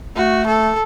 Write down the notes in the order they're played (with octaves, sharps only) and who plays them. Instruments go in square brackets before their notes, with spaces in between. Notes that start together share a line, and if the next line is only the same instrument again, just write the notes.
[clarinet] A3 [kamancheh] F#4
[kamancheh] A4